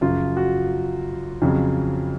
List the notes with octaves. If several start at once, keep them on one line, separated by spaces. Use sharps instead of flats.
F#2 C#3 F3 F4
F#4
F2 C#3 F#3